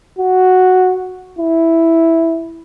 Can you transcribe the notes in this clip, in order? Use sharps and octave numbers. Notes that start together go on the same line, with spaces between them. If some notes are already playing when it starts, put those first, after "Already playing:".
F#4
E4